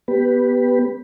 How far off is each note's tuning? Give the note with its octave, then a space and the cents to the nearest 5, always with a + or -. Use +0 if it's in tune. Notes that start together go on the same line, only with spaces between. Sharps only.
B3 -10 G4 +5 B4 +0